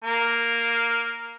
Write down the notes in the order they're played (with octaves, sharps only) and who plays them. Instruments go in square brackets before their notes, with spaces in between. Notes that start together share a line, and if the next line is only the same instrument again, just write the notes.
[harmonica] A#3